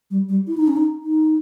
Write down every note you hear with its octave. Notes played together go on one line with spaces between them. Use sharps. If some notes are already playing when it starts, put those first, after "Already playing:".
G3
G3
E4
D#4
C#4
D#4
D#4